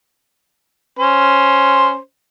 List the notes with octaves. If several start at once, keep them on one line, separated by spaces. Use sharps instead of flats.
C#4 C5